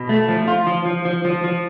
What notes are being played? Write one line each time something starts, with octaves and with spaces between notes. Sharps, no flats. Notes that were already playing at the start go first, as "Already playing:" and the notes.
Already playing: B2
A3
F3
F4
F3
F3
F3
F3
F3